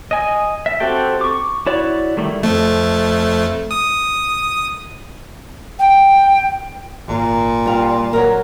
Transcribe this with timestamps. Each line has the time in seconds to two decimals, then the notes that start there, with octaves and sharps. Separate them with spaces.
0.11 D#5 G#5
0.66 E5
0.80 C4 F#4 G4 A4 G5
1.21 C#6 D6
1.66 E4 F#4 C#5 D5
2.17 D#3 G3 A3 E4
2.43 F2 A3
3.71 D#6
5.79 G5
7.08 G#1 A#2
7.66 G3 F4
8.13 D#1 F#3 A#4